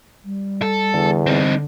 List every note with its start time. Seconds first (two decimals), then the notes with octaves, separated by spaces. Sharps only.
0.24 G3
0.62 A4
0.94 E2 D3
1.27 G3 C4 D#4